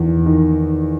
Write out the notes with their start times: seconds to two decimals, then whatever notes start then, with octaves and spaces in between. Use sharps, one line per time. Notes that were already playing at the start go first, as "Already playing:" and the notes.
Already playing: E2 D#3
0.26 D#3